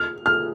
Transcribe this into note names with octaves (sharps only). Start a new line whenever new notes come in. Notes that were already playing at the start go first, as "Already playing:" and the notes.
Already playing: F6
F6